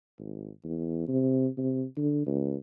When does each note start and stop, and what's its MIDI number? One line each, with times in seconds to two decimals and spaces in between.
0.19 0.49 32
0.64 1.04 40
1.08 1.47 48
1.58 1.84 48
1.97 2.22 50
2.26 2.55 37